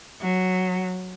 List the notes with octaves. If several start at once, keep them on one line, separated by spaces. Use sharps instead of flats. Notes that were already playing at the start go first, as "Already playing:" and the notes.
F#3